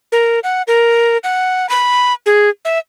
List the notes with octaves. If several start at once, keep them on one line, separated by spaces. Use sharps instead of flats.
A#4
F#5
A#4
F#5
B5
G#4
E5